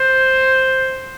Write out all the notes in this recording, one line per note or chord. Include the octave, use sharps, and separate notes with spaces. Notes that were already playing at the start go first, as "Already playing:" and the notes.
Already playing: C5